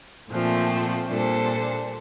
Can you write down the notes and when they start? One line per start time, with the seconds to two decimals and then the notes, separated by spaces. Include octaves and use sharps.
0.29 A#2 F3 A3 C4
1.07 A#2 G3 D4 A4 C5